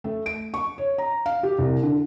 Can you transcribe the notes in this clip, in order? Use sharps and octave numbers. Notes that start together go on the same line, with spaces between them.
A3
D7
C#6
C#5
A#5
F5
G4
C2
D3